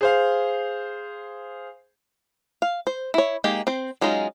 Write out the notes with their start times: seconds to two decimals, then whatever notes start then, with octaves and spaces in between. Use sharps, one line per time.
0.01 G#4 C5 F5
2.62 F5
2.87 C5
3.14 E4 C#5
3.44 G#3 A#3 D#4 G4
3.67 C4 C5
4.01 F#3 G#3 C#4 D#4 F4